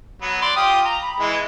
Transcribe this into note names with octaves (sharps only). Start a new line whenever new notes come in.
F#3 B3
D5 C6
F4 G4 D#6
A#5
B5
E3 G#3